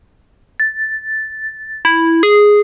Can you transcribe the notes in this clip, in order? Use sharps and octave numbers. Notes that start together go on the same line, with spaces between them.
A6
E4
G#4